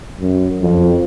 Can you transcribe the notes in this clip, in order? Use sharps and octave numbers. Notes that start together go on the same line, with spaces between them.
F#2
F2